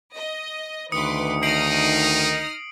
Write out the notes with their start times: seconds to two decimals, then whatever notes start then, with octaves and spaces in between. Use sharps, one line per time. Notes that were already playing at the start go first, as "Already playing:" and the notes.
0.15 D#5
0.92 D2 D#3 B4 C6 D6 D#6 C#7
1.43 D#4 D#6 F6 A#6 C7 D7 F#7